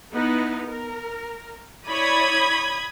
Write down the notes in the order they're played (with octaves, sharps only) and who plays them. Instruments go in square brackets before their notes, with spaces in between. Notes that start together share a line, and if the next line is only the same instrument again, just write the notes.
[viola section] B3 D#4 E4
A#4
[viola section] E4 C#5 D5 [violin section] B5 D#6 G#6